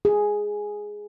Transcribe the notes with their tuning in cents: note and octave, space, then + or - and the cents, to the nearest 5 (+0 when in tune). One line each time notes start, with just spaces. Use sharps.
G#4 +0